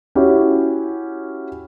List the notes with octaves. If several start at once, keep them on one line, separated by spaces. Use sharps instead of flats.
C#4 E4 F#4 G4